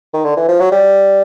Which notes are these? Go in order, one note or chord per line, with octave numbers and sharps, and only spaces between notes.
D#3
D3
E3
F3
F#3
G3